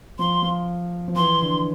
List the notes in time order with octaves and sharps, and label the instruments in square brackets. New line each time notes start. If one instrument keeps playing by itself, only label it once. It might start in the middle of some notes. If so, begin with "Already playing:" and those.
[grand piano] F3 [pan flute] C6
[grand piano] F3
F3
[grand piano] E3 [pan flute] C6
[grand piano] D3